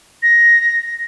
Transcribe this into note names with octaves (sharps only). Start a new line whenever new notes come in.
A#6